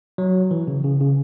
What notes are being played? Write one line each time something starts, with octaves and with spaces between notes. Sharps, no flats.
F#3
E3
C#3
C#3
C#3